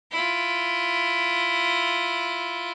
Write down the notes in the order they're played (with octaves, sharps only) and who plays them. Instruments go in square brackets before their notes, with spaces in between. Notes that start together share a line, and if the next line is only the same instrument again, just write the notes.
[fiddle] E4 F4